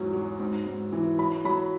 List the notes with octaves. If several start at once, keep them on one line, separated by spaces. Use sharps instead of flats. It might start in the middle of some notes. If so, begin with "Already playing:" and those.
Already playing: E2 G#2 F#3
F#3
G#2
G#2
E3
F#3 B5
F#3 B5